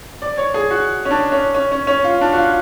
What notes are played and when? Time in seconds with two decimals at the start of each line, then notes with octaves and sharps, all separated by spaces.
0.22 D5
0.38 C#5
0.54 G#4
0.71 F#4
1.05 C#4
1.11 D4
1.32 C#4
1.54 C#4
1.72 C#4
1.87 C#4
2.04 F4
2.21 D4
2.33 F#4
2.38 F4